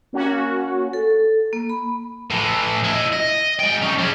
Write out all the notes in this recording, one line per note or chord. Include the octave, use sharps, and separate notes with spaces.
A#3 C#4 F#4
A4
A#3
B5
A2 E3
E4 D#5
D#5
G#3 G5
C#4 D#4
G3 G#4